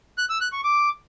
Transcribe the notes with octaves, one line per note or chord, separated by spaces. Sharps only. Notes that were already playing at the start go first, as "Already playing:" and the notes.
F#6
E6
F#6
C#6
D6